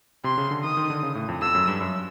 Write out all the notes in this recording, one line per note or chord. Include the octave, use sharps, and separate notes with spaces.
C3 C6
C#3
D3
D#3 D#6
D#3
D3
C#3
A2
F2
F2 E6
F#2
G2
F#2